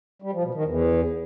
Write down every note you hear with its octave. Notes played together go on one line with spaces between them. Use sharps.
G3
F3
B2
D#3
E2